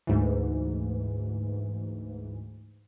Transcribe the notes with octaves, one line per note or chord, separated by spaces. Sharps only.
D2 G#2 E3